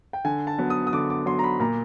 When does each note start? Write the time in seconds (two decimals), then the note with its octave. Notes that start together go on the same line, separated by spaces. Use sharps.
0.13 G5
0.25 D3 G#5
0.47 A5
0.58 F#3 B3
0.70 D#6
0.87 D#6
0.93 D3 D6
1.10 D6
1.26 F#3 B3 C6
1.39 A#5
1.44 B5
1.60 A#2 A#5